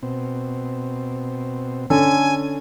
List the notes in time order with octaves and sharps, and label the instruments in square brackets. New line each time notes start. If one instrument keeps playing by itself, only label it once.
[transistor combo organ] B2 C4
[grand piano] D3 C#4 A4 [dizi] G#5